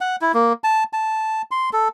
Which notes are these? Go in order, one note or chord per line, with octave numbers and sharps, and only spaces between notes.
F#5
E4
A#3
A5
A5
C6
A4